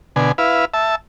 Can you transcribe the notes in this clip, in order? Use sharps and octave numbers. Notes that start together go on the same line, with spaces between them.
B2 D3 G#5
E4 B4 F5
E5 A5